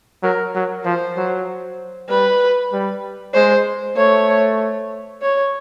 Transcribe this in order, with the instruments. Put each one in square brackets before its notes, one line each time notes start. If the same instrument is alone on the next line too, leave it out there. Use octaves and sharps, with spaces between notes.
[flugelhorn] F#3 [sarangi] A#4
[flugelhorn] F#3
[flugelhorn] F3 [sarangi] C5
[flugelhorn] F#3
[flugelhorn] G3 [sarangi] B4
[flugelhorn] G3
[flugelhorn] G#3 [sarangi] C5
[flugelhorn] A3 [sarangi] C#5
[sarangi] C#5